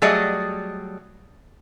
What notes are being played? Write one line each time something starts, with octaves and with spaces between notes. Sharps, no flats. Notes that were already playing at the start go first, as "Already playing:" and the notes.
F#3 G3 A3 G#4 D5 D#5